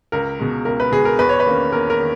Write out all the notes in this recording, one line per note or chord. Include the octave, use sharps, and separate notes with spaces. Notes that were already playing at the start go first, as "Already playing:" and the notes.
C#2 A#4
B2 G#3
C#2 A#4
B4
B2 G#3 G#4
A#4
E2 B4
C#5
B4
D#3 A#3 C#4
E2 A#4
A#4
D#3